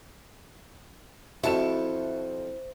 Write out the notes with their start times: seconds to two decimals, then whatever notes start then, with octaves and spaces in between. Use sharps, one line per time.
1.44 F2 E4 F#4 C5 A5 C#6 E7